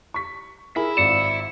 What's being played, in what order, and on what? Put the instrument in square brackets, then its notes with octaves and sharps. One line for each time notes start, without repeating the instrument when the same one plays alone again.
[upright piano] C#6 B6
[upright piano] E4 G#4 A#4 [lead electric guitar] E5 B5
[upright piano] G#1 D5 [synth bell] C#7 E7